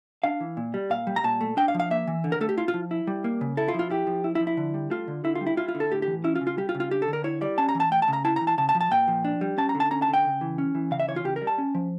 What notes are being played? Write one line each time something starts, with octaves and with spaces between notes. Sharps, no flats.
D4 F5
E3
A#2
G3
A#2 F5
G3
A#5
A#2 A5
A3
D4 G5
F5
F3
F5
A#3 E5
E3
D3
A#4
A3 A4
G4
E4 F4
F4
F3
E4
G3
A#3
C#3
E4 A4
F4
F3
F4
E4 G4
F3
E4
E4
F3
E4
D3
G3
A3 F4
D3
D3 E4
F4
G3
E4
E4 F4
F4
D3
A4
A2 G4
G4
E3
C#4 E4
F4
C#3
F4
G3 G4
F4
C#3
F4
D4 G4
A4
D3
A#4
E4 C#5
G3 D5
C#4 A5
A#5
E3
A5
A3 G5
A5
C#3
A#5
E4 A5
E3 A#5
A5
C#3 A5
A5
F3
A5
A#2 G5
F3
D4
G3
C#4 A5
A#5
D3
A5
C#4 A#5
A5
D3
G5
C#3
E3
C#4
E3
C#3 F5
E5
E3 C#5
F4
C#3 G4
A#4
G3
A5
C#4
F3